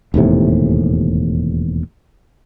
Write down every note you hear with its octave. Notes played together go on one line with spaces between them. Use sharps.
E1 D#2 A2 C3